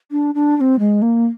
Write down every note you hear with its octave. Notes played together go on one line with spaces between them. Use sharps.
D4
D4
D4
C4
G#3
A#3